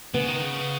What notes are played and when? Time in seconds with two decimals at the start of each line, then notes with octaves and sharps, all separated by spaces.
0.14 C#3 B3
0.28 D#3
0.42 C#3